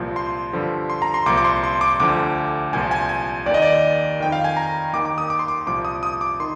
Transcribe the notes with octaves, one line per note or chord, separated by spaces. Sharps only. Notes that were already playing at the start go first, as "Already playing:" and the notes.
Already playing: C2 A#2 F3
C6
G2 D3 F3
C6
A#5
C6
C2 A#2 F3 D6
D6
C6
C6
D6
D2 D3 F3 D6
C2 A#2 F3 G#5
G#5
G#5
D#2 D#3 D5 D#5
D5
F2 D#3 G5
F5
G#5
A#5
D#2 D#3 D6
D6
D#6
D6
C6
D6
C2 A#2 F3 D6
D#6
D#6
D6
D#3 C6